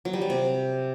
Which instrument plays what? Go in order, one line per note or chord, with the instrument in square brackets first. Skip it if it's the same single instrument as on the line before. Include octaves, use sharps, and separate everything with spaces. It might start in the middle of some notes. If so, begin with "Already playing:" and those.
[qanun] F#3
G3
F#3
C3